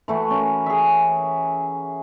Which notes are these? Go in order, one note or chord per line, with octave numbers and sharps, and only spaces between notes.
E3 A3 F#4
C#4 A#4
G#4 E5